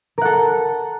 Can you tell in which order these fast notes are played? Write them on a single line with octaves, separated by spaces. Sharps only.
A#4 F#5 A4